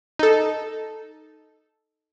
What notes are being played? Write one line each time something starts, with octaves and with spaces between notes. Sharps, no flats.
D#4 A4